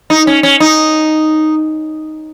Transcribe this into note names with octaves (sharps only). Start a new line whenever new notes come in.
D#4
C#4
C#4
D#4